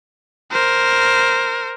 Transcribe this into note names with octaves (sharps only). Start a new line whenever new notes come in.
A#4 C5